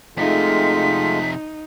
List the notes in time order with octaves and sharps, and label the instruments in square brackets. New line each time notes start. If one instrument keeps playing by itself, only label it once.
[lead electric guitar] F2 C3 [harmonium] G#3 A3 F4 [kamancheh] D#4 [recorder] B6